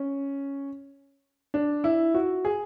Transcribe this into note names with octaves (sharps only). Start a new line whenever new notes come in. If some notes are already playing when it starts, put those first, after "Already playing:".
Already playing: C#4
D4
E4
F#4
G#4